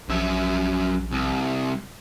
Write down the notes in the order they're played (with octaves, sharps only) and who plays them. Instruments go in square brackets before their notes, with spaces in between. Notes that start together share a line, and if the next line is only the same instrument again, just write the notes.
[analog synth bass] A#1 [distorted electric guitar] F#2 E5
[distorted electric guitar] C2